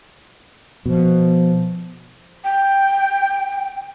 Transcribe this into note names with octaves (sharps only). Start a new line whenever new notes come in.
B2 F3
G5